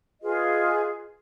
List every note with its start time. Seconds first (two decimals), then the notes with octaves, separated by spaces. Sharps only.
0.22 F4 G#4 B4 D#5